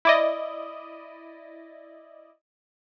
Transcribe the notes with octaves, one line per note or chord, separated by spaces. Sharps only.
E4 D5 D#5